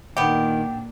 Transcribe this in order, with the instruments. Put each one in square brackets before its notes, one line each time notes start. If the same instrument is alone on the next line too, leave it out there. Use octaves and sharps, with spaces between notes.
[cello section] A#2 D4 [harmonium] D#3 [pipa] B3 G4